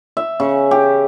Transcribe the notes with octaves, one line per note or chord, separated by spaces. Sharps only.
E5
C#3
G4